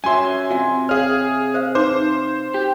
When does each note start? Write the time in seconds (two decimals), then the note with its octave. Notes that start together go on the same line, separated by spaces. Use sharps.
0.04 F#2 F#3 E5 G#5 C6
0.51 C3 F4 E5 F#5
0.89 G#4 C#5 F5 F6
1.54 C5 E5 F5
1.75 D#4 B4 C5 D6
2.54 G4